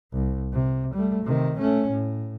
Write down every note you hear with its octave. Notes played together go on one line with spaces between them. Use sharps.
C2
C3
G3 A3
C3 D#3
A3 C#4
A2